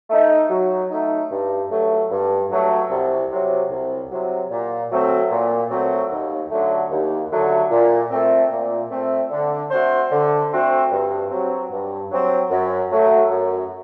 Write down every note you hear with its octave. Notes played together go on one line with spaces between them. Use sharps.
A3 D#4
F#3
A3 D#4
G2
F#3 A3
G2
F#3 A3
C2
C3 F#3
C2
C3 F#3
A#2
F#3 A3 C4
A#2
F#3 A3 C4
D#2
D3 F#3 A3
D#2
D3 F#3 A3
A#2
A3 C4
A#2
A3 C4
D3
A3 C4 F#4 C5
D3
A3 C4 F#4 C5
G2
F#3 C4
G2
F#3 C4
F#2
F#3 A3
F#2